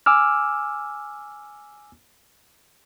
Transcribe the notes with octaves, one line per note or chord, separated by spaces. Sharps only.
G#5 D6 E6 F6